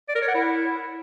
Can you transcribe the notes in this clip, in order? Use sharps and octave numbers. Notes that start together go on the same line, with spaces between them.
D5
A#4
C#5
F#5
E4